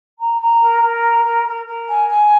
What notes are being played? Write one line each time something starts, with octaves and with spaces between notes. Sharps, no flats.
A#5
A#5
A#4
A#4
A#5
A#4
A#4
A#4
G#5
G#5